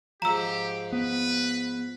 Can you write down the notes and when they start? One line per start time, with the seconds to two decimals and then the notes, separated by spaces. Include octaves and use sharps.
0.22 G#2 F3 G4 A#5 E6
0.92 B3 B4